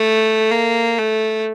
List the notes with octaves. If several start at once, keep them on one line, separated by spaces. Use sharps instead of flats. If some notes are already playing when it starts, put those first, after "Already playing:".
Already playing: A3
A#3
A3